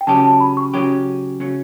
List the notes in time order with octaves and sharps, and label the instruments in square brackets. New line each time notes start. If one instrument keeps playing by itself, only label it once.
[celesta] G5
[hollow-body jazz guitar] C#3 F#3 C#4 G4 [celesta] A5
[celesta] A5
B5
C#6
[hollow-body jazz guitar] C#3 F#3 C#4 G4
C#3 F#3 C#4